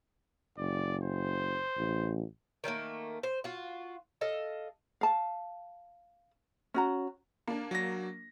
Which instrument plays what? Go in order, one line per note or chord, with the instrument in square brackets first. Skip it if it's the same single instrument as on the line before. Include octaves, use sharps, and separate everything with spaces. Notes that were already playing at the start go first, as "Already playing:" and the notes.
[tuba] F#1 [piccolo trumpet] D5
[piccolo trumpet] C5
[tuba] A1
[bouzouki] D#3 G3 A3 A#3
C5
F4 F#4
A4 D#5 F5
[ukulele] F5 A5
C#4 F#4 A#5
[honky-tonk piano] A#3 D4
[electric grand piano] F#3 A#6